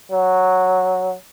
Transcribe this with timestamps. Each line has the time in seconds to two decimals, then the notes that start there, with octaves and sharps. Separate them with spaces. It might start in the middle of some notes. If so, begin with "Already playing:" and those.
0.12 F#3